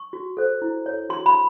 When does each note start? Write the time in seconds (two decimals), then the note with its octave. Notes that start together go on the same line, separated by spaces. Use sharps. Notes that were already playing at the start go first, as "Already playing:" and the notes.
Already playing: C#6
0.13 F#4
0.37 A4 C5
0.62 E4
0.86 A4 C#5
1.09 F#4 C6
1.26 B5